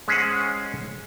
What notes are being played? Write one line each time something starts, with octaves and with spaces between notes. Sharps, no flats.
G#3 C#4 G#4 C5 F#5